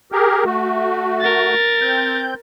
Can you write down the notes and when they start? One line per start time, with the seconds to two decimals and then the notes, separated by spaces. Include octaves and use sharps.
0.12 G4 G#4 A#4
0.45 A3 F#4
1.20 A#4 A6
1.82 C4 G6